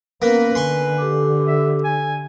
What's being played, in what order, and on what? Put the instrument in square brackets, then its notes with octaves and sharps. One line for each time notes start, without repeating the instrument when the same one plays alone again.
[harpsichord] A#3 [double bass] B3 [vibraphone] C#4 A#4 [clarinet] B4
[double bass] D3 [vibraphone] G#5 [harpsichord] C6 C#6
[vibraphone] G4 A4 D6
[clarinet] E5
G#5